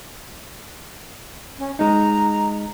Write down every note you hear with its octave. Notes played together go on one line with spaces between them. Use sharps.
C#4
G#3 D#4 A#5